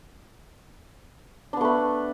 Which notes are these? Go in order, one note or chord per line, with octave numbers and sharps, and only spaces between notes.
A3 B3 D4 B4